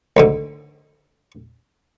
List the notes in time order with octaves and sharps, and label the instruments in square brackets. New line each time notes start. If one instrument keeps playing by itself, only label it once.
[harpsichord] D2 G#2 D3